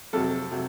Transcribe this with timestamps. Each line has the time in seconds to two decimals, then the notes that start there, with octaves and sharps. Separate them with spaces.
0.13 F2 C3 F#3 A4
0.51 C3 F#3